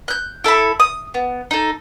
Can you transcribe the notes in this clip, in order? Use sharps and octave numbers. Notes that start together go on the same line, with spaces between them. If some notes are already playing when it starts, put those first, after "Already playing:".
F#6 G6
E4 A4 E5 B5
D#6
B3
D#4 A4